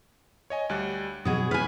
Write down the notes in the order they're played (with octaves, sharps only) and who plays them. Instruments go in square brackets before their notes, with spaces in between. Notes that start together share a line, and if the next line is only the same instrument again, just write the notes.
[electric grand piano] C#5 D#5 G#5
D2 G3 F#6
[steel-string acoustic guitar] B2 F#3 G#4 [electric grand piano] D#6
[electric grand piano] A2 F6 B6 [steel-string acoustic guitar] B4 G#5